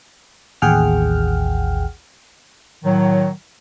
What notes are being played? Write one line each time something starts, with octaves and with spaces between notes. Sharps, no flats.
A1 D#2 G#4 F#5 G5 F6
A2 D#3 F#3